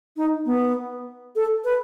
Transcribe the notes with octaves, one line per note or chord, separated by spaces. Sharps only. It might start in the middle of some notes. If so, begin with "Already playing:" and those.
D#4
B3
A4
B4